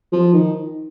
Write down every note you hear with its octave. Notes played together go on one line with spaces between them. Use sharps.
F3
D#3